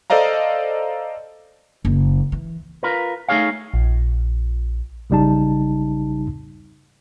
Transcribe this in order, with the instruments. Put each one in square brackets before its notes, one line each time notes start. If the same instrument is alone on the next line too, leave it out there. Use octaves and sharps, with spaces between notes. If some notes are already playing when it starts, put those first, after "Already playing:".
[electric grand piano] A4 C5 D5 D#5 F5 A#5
[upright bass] F#1
E3
[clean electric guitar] F4 A#4 B4
A3 D#4 G#4 C#5 F5
[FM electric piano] A#1
[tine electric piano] A#1 C#3 G3 D#4 A5